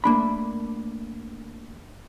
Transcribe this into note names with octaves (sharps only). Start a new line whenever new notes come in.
A3 A#3 D4 B5